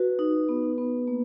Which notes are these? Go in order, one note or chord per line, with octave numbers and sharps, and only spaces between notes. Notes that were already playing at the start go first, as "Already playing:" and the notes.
Already playing: F#4 B4
D#4
B3
B3
A#3